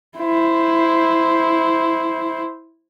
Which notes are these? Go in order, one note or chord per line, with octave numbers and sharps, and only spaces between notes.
E4 C5